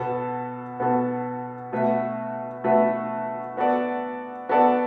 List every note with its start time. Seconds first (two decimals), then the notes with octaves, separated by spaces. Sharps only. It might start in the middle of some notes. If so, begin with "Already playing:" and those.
Already playing: B2 B3 F#4 A4
0.80 B2 B3 F#4 A4
1.72 B2 A3 F#4 B4 E5
2.64 B2 A3 F#4 B4 E5
3.57 B3 F#4 A4 D5
4.49 B3 F#4 A4 D5